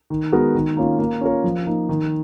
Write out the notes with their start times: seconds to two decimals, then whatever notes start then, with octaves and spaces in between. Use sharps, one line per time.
0.10 D#3
0.32 G#3 B3 F#4 A#4
0.55 D#3
0.77 A#3 C#4 F4
0.99 A#3
1.21 C#4 F4 A#4 C#5
1.44 F3
1.67 A#3 D#4
1.89 D#3